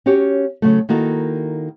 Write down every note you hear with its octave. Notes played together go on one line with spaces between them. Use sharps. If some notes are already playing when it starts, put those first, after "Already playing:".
C#4 F#4 G4 C#5
C#3 F#3 A3
D#3 A#3 E4 F#4 A4